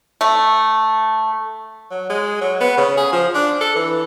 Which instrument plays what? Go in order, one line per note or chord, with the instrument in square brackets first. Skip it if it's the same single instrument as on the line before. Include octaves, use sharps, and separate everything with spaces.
[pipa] A3
[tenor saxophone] F#3
G#3
F#3
B3
C#3
G#4
F3
D4
A4
E3